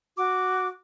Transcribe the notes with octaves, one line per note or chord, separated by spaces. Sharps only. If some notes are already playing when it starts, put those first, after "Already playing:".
F#4 D6